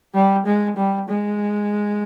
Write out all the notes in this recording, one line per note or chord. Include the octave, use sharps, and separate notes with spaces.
G3
G#3
G3
G#3